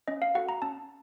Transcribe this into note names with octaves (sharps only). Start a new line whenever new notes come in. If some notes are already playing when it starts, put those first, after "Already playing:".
C#4 D#5
F5
F#4 A4 F#5
A#5
C#4 A5